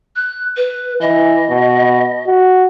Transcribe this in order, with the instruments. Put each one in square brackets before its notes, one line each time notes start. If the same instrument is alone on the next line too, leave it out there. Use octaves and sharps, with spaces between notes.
[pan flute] F#6
B4
[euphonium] E3 [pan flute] D#5
[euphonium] B2
F#4